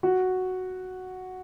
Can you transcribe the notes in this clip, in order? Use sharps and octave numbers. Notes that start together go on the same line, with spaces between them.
F#4